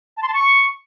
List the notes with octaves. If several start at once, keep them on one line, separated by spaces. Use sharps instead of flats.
A5
C6
A5
C#6